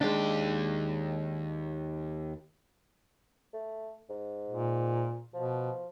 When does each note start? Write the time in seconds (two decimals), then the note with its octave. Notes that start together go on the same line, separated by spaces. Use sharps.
0.01 D#2 G#3 D4 G4
3.53 A3
4.09 G#2
4.49 A#2
5.34 B2 F3